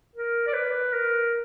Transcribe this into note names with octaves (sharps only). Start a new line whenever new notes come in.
A#4
D5
B4
A#4